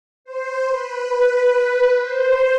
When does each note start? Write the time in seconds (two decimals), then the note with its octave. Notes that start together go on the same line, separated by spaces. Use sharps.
0.25 C5
0.69 B4
1.12 B4
1.99 C5